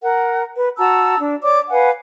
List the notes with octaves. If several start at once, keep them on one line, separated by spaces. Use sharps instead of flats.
A#4 F#5
B4
F#4 A5 A#5 E6
D4
C#5 D5 D6
B4 F5 F#5 G#5